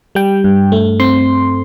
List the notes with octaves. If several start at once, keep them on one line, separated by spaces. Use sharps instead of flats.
G3 G5
G2
A3
C4 C6